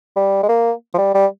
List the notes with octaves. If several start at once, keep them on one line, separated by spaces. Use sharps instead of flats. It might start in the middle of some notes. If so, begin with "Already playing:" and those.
G3
G#3
A#3
F3
G3
G3